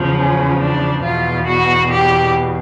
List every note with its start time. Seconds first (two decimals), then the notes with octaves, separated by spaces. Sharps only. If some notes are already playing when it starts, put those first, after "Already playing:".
Already playing: E2 C#3 F3
0.16 C#4
0.59 D4
1.02 E2 B2 F4
1.46 F#4
1.90 G4